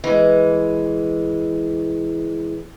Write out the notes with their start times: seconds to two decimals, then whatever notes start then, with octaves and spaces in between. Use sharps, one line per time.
0.04 E3 G#3